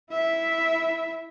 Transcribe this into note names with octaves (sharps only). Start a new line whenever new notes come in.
E4 E5